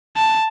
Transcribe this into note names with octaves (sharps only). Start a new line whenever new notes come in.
A5